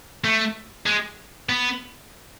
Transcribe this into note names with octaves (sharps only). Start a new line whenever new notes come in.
A3
G#3
B3